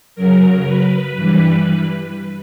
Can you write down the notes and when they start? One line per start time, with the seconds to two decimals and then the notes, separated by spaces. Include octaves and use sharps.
0.15 F#2 C#3 F#3 A#4
0.65 B4
1.16 G2 E3 G3